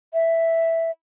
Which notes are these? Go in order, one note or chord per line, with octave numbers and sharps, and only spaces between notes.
E5